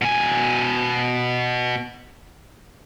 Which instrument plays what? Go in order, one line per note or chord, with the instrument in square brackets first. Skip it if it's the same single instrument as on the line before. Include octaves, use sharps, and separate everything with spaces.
[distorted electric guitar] B2 G#5